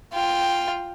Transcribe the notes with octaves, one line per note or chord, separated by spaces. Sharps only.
F4 G5